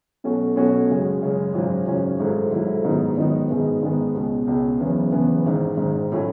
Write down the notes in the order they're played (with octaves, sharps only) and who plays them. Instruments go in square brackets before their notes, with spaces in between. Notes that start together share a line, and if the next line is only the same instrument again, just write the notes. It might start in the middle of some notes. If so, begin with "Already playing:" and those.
[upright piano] B2 F#3 A3 C#4 F#4
B2 F#3 A3 C#4 F#4
F#2 C#3 G#3 C#4
F#2 C#3 G#3 C#4
G#1 F#2 C#3 F#3 C#4
G#1 F#2 C#3 F#3 C#4
G#1 G#2 F#3 A3 E4
G#1 G#2 F#3 A3 E4
G#2 D#3 F#3 B3 D#4
G#2 D#3 F#3 B3 D#4
G#2 D#3 G#3 B3
G#2 D#3 G#3 B3
C#2 B2 G#3
C#2 B2 G#3
F#1 E2 C#3 E3 B3
F#1 E2 C#3 E3 B3
G#1 G#2 D#3
G#1 G#2 D#3
A2 F#3 C#4